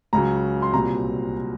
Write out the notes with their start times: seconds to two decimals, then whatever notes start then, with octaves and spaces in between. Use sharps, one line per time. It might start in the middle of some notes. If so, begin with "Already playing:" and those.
0.13 C#2 C#3 F#3 A#5
0.62 C6
0.73 C2 A#2 F#3 C4 A#5